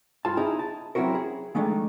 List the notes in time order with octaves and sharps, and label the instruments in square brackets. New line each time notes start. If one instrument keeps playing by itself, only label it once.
[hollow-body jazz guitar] G2 F4 A5
D#4 E4 G#4
A5
F#3 C4 C#4 E4 F#4 A#4
G#4
D#3 F3 G#3 A3 D4 D#4